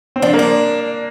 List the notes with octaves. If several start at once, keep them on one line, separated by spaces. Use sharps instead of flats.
C4
F3 D4
A#3
D4